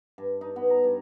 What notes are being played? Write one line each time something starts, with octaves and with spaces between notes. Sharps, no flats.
G2
D#4
B3
A#5
G2